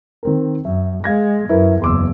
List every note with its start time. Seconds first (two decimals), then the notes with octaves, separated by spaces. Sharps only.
0.23 D#3 C4 A#4
0.65 F#2 E5
1.04 G#3 F5 G#6 A#6
1.49 F#2 E4 A#4 B4
1.82 F#1 E2 C6 D6 E6